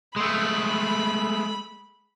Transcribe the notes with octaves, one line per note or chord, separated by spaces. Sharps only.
G#3 A3 B5